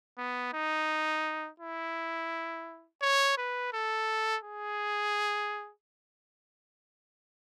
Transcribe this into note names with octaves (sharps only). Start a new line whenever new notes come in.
B3
D#4
E4
C#5
B4
A4
G#4